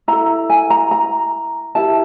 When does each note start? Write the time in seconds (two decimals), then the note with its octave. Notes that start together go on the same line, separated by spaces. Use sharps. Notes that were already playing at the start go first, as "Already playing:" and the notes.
0.08 E4 A4 A#5
0.50 G#5
0.70 A#5
0.91 A#5
1.75 E4 G4 A#4 A5